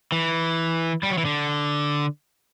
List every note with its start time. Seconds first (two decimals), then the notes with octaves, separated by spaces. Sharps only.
0.12 E3
1.03 G3
1.10 F#3
1.18 E3
1.25 D3